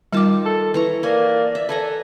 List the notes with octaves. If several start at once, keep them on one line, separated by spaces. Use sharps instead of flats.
D#3 G3 F4 A5 D6
A4
E3 A4 A#5 C#6
A#3 B4 D5 G#5
E5
A4 B4 G#5 A#5